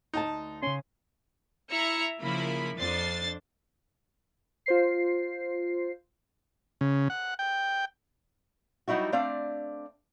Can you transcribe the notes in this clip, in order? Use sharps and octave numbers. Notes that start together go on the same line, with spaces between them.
D2 D#4 G5 A5
C#3 C#4 C6
E4 E5 A#5 C#7
C#3 F3 A#3 E4 B5
F2 D4 C5 A6 C7
F4 C5 C7
C#3
F#5
G5
F#3 G3 D#4 E4 F#4
A3 C4 D4 D5 F5